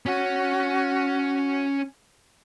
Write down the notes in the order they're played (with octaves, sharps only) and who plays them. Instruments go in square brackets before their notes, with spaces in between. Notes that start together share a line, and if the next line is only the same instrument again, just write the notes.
[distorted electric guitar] C#4 C#5 [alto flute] F#4